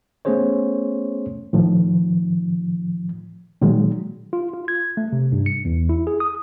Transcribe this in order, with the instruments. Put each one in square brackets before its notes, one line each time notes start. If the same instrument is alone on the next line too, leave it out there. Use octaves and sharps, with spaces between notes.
[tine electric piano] A3 B3 C#4 G#4 C5 C#5
[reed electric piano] A2 D#3 F3
A#2 D#3 F#3 G#3
[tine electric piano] F4
F4
G#6
A3
C3
G2
C#7
E2
E4
G#4
D#6